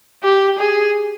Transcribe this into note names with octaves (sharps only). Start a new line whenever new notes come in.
G4
G#4